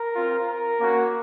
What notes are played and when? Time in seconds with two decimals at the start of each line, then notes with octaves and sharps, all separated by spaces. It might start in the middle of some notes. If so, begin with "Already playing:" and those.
Already playing: A#4
0.15 C4 F4
0.47 A#4
0.79 A#3 C#4 F#4